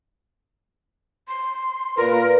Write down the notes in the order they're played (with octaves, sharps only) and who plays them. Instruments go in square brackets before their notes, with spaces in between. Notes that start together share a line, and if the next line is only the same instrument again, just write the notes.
[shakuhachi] C6
[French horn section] A#2 B4 [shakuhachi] A#4